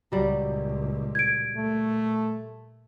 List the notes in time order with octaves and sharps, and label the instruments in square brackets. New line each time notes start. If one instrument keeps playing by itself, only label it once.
[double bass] C#2 A#2 [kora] F#3 G3
[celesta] G#6 D7
[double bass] A#2 [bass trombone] A3